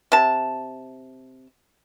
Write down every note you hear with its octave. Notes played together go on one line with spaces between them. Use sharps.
C3 A5